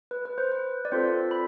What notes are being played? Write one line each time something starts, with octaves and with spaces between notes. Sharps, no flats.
B4
B4
C5
B4
D5
C4 F4 A4 C5
B5